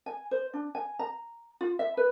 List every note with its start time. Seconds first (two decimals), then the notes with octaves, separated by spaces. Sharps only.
0.06 G#5
0.31 C5
0.54 D4
0.75 G#5
0.99 A#5
1.61 F4
1.79 E5
1.97 B4